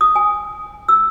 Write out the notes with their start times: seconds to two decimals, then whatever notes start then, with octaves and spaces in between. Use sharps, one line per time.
0.01 D#6
0.16 G#5
0.89 E6